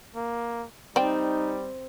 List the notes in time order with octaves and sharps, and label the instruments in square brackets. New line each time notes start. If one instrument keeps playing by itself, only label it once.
[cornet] A#3
[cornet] G3 [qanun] C4 [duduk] D#4 [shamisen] D5 G5